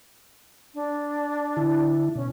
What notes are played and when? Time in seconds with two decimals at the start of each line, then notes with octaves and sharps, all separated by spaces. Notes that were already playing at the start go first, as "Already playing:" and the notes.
0.74 D4
1.57 D3 E4
2.15 B2 C#4